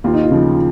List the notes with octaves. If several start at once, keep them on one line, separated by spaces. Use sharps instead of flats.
D#2 F4
D#4
F4
C#3 F3